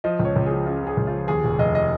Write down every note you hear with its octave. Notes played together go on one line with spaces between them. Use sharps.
F3 D#5
C#2
C#5
C#2
F3 G#4
C#3 F4
C#3 G#4
C#2
F4
F3
D#2 G#4
F1
F1 D#5
D#5